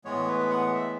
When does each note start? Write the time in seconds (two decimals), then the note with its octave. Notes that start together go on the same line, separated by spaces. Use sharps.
0.04 A2 E3 G#3 B3 C#5
0.28 B4
0.51 F#5
0.74 E5